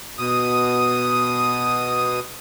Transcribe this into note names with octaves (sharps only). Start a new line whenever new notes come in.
B2 D#6